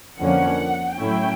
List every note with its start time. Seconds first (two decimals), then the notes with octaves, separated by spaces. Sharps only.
0.18 F2 D3 F3 A#3 C#4 F#5
0.98 A2 F#3 A3 C#4 E4 G5